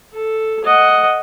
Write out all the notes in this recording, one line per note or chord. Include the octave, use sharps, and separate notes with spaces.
A4
D#5 F#5